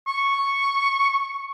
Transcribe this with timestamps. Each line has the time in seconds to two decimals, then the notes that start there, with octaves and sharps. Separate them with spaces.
0.07 C#6